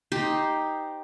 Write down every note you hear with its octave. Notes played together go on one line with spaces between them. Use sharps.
D#4 G4 C5 D#5